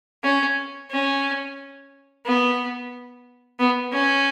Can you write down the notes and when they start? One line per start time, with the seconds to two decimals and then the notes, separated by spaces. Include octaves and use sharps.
0.24 C#4
0.91 C#4
2.25 B3
3.59 B3
3.92 C#4